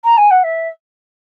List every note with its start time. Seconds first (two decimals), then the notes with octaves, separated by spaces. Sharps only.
0.04 A#5
0.18 G#5
0.31 F#5
0.44 E5